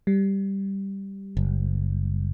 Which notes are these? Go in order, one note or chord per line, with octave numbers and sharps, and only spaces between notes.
G3
F#1